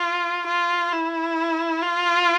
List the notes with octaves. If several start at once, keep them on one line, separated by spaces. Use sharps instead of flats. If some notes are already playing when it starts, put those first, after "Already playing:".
Already playing: F4
F4
E4
F4